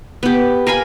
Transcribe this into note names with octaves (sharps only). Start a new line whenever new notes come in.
B3 G4
A#4 F5 G#5 B5